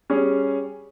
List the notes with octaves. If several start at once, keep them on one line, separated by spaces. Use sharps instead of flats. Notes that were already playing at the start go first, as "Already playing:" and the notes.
G3 C#4 G#4